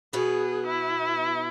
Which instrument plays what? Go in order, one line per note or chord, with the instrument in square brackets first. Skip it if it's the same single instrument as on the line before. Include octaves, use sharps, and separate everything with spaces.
[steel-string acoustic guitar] B2 B3 [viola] G#4
[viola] E4